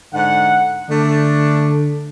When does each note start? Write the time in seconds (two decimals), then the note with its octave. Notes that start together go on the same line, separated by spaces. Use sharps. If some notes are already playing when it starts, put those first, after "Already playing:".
0.13 G#2 D3 F#5
0.89 D3 A3 D4